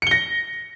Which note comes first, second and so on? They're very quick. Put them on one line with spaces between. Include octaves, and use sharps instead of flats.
C#7 G7 A#6